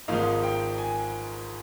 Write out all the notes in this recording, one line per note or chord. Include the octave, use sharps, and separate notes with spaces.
G#1 G#2 F3 A#3 D#4 F5
G5
G#5